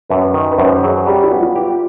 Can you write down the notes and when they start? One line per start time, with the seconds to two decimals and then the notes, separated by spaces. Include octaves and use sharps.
0.09 F#2 B4
0.34 D#3
0.51 B4
0.58 F#2 C5
0.83 F#3 G#4
1.07 G3 G4
1.24 F#4
1.32 B3
1.39 F4
1.56 G4